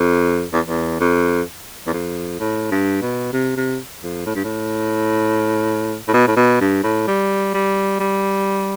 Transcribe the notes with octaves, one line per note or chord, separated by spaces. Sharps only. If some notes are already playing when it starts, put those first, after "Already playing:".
Already playing: F2
E2
E2
F2
E2
F2
A2
G2
B2
C3
C3
F2
A2
G2
A2
A2
B2
A2
B2
G2
A2
G3
G3
G3